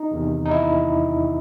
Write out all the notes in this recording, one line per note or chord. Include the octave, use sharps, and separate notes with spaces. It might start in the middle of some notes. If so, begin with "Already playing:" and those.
Already playing: D#4
E2 C3 D#3
D#4
E4